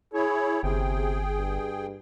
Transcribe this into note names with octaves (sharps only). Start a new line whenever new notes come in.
E4 G#4 C#5
G1 C3 G#4 G5
G2